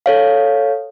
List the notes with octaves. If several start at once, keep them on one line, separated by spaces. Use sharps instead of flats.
A4 C#5 F5